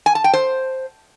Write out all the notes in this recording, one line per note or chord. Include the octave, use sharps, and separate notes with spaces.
G#5
A5
G5
C5